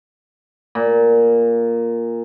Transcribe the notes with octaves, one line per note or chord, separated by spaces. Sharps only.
A#2